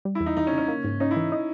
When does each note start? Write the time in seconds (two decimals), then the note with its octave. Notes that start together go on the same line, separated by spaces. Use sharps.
0.05 G3
0.15 E4
0.20 E2
0.26 D#4
0.37 E2 D#4
0.47 C#4
0.52 C#3
0.58 C#4
0.68 A#3
0.84 G#2
1.00 C#4 D#4
1.11 E4
1.16 E3
1.32 D#4